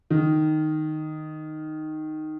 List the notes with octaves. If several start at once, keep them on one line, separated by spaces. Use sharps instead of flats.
D#3